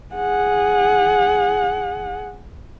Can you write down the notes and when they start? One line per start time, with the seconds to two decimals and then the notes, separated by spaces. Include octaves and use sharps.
0.15 G#4 F#5